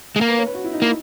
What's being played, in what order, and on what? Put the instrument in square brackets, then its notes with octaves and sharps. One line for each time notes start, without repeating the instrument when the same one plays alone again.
[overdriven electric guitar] G#3
A#3
[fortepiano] B4
C#5
B4
F#4
E4
D#4
[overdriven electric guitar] A#3 [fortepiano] E4